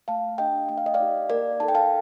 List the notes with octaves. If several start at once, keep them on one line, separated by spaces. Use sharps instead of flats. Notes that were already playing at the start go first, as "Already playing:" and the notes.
A3 F5 A5
D4 G4 D#5 G5
A3 G5
F5
D#5
D5 F5
D#4 G4
A#3 A#4 D5
D#4 A4 A5
G5
F5 A5